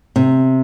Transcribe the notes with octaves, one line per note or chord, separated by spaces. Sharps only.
C3